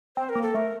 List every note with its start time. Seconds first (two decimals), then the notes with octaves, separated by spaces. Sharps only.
0.17 C4 C5
0.29 A#4
0.35 A#3
0.43 A4
0.54 A3 A#4